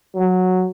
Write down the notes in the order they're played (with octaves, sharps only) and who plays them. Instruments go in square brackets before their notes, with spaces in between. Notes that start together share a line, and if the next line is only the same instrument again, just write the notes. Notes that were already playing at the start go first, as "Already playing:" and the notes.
[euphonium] F#3